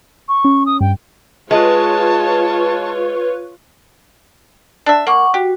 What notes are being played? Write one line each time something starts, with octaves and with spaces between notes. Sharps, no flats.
C#6
C#4
D#6
G2 G5
G#3 F4 B4 C#5 A5
D4 E5
A#3 F#5 C#6 D6
F#4 G4